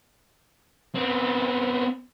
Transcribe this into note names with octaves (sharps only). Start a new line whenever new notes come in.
B3 C4